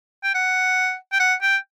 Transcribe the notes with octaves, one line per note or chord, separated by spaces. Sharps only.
G5
F#5
G5
F#5
G5